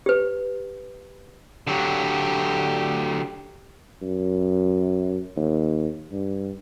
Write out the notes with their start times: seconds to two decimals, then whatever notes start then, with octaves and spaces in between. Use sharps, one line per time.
0.06 G4 B4
1.67 D3 F#3 G4
4.02 F#2
5.36 D#2
6.12 G2